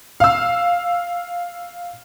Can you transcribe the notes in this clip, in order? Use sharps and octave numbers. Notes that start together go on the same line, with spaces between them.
F5 E6